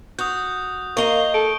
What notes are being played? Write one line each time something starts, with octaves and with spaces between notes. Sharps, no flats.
F#4 D#6 G6
A#3 D#5 F5 A#5 C#6 G7
A4 D7